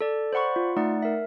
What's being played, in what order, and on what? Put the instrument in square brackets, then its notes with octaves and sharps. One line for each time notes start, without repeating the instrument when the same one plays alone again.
[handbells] A4 D5
C5 D5 F#5 B5 C#6
F4
A3 D#4 D5 F#5
A#4 E5